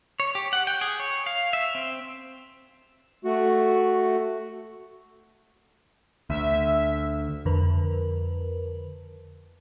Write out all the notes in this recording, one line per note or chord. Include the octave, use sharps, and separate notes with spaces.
C#5
G4
F#5
G5
G#4
C#5
F5
E5
C4
A3 F#4
D2 E5
F2 D3 A#4 B4